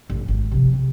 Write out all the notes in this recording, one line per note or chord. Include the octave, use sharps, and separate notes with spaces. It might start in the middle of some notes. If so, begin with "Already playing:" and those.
A1
G#1
C3 F3
C3